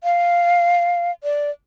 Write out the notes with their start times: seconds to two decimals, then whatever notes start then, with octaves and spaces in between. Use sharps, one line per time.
0.04 F5
1.24 D5